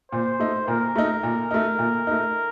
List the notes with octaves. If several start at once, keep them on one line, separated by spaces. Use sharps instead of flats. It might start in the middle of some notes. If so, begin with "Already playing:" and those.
A#2 C5
A3 D#4
A#2 A#4
A3 D#4
A#2
A3 D#4
A#2
A3 D#4